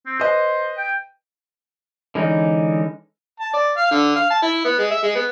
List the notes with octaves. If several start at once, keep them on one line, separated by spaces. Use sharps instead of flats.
C4
B4 C5 D#5
G5
D3 E3 G#3 C#4 D#4
A5
D5
F5
D3
F5
A5
E4
B3
G#3
E5
G#3
B3